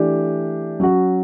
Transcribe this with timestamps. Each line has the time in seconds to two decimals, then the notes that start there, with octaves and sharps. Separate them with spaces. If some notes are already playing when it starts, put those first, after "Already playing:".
Already playing: E3 A3 D4 G4
0.80 F#3 C#4 F#4